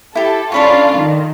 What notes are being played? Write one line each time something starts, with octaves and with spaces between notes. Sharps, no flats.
E4 G4 A4
C#4 D4 F4 A4 B5 C#6
D#3